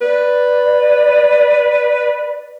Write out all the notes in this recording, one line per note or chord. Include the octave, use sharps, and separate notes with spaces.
B4 D5